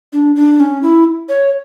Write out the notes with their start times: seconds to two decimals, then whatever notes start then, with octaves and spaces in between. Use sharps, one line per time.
0.13 D4
0.36 D4
0.60 C#4
0.83 E4
1.29 C#5